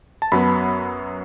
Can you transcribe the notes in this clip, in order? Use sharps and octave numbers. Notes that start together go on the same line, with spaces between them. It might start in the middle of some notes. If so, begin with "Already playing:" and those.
A5
F#2 F#3 B3 B5